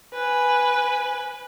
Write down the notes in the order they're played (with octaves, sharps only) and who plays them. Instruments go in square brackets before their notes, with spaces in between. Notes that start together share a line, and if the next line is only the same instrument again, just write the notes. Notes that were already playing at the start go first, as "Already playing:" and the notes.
[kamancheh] B4 G#5